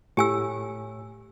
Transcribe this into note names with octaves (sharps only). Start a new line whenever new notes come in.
A2 G4 G#5 E6